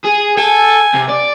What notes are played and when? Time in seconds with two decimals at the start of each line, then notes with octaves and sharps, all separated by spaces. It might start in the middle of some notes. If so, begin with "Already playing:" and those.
0.05 G#4
0.37 A4 G#5
0.94 C3
1.09 D5